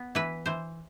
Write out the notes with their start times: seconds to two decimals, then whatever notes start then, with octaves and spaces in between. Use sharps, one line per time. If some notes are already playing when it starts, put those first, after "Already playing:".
Already playing: B3
0.15 E3 B4
0.46 E3 C5